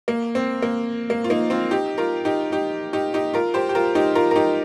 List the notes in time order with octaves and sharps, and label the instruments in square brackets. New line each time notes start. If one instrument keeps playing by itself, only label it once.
[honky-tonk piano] A#3
C4
A#3
A#3
F4
A#3 D#4
C4 F4
D#4 G4
F4 A#4
D#4 G4
D#4 G4
D#4 G4
D#4 G4
F4 A#4
G4 C5
G4
F4 A#4
D#4 G4
F4 A#4
A#4
D#4 G4